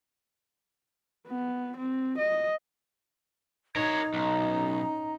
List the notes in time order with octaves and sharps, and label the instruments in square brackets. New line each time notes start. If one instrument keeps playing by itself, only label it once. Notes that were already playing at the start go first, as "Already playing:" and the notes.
[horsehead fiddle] B3
C4
D#5
[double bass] D#4 [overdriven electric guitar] A#4 C#5 [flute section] G#6
[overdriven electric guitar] B1 [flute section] C#4 A#5